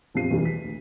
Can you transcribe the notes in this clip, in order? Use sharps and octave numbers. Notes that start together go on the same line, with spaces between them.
A#1 F2 F4 G4 C7 D#7
B1 E2 D3 G3 A3
B6
D2